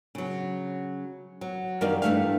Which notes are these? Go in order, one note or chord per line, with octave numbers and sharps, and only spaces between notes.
C#3 F#3
F#3
F#2 D#3 G3 A#4 D5 F5
G2 E3 A3 E4 F5